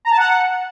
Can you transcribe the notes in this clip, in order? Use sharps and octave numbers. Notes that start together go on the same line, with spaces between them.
A#5
A5
F#5